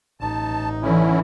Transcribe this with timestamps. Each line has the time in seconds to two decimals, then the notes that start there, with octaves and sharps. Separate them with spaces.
0.20 A1 D#4 A5
0.83 D3 E3 C#4 E4